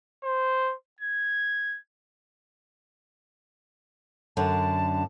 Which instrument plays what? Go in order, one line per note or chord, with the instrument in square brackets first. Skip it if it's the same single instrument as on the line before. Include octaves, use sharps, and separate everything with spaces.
[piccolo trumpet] C5
G#6
[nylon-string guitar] F#2 D3 [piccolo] A5